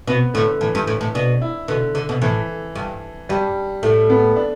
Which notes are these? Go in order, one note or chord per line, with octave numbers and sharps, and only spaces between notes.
B2 B3
A2 D3
A2 E3
G2
A2
A2
B2 D4
E4
B2 D3
D3
B2
A2 E3
G2
G2 G3
A2 A3
B3
D4